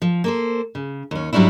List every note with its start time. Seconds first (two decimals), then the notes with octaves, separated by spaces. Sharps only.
0.02 F3
0.24 A#3 A4 C5
0.75 C#3
1.11 D#2 C#4
1.33 G#2 F#3 G3 C#4 D4 E4